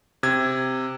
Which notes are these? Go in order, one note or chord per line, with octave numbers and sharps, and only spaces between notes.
C3 G#6